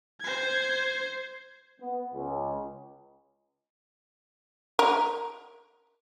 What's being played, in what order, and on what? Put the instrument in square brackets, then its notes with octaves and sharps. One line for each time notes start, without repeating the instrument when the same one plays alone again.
[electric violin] C5 G#6
[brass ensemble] B3
C#2
[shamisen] A#4